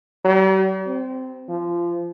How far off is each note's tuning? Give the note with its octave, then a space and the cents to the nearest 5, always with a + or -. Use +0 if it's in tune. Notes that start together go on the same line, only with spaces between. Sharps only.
G3 -45
C4 -15
F3 -20